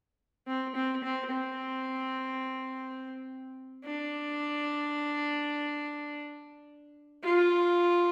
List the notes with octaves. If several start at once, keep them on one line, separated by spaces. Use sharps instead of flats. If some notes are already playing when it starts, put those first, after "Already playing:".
C4
C4
C4
C4
D4
F4